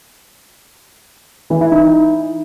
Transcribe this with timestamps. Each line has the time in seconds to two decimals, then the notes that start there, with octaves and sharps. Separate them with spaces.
1.50 E3
1.61 E4
1.71 D#4